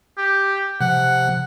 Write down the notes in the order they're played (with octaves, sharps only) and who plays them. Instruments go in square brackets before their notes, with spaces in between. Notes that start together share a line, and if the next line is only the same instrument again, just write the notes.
[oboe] G4
[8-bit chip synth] C3 F3 [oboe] F#5